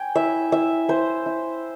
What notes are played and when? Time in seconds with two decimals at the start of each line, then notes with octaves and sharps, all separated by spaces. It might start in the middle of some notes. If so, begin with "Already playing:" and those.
Already playing: G5 G#5
0.15 E4 E5
0.52 E4 E5
0.89 E4 C5
1.26 E4